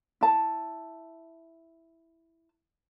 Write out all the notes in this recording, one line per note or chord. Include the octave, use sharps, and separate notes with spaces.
E4 A5